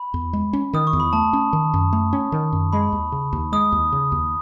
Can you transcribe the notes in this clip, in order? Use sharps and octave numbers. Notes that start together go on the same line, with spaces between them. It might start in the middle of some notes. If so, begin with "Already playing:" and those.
Already playing: B5
E2
G#3
C#4
D#3 D#6
C#6
E2
B5
A3 A5
C#4
D#3
F#2
A3
C#4
D#3
F#2
G#3 B5
D#2
C#3
D#2
G#3 D#6
D#2
C#3
D#2